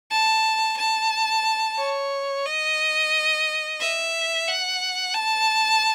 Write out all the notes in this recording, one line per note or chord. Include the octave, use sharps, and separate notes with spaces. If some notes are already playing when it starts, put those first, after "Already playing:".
A5
A5
C#5
D#5
E5
F#5
A5